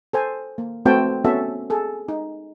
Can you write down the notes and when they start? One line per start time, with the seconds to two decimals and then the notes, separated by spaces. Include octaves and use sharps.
0.13 A4 C5 G#5
0.58 A#3
0.85 A3 C4 F#4 B4 G5 A5
1.25 B3 C#4 F#4 A4 E5
1.70 G#4 A4
2.08 D#4